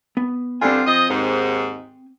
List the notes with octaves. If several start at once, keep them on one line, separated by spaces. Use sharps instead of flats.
B3
G2 D3 C4 F4 G#5
F3 D#5
D#2 G#2